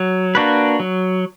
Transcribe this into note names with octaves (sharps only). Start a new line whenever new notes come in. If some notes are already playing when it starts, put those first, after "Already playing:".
Already playing: F#3
A#3 D4 F#4 B4
F#3